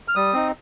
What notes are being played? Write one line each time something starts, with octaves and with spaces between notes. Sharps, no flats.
F6
G3 D#6
C4 D#4